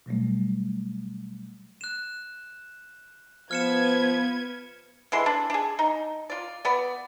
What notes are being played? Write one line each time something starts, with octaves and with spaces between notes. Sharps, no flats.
B2 F#3 G3 A3
F#6 E7
F3 B3 B4 F6 G#6 C#7 E7
D3 E3 G#3 C6
D4
D4 G#4
D#4
F4 D5
B3 D5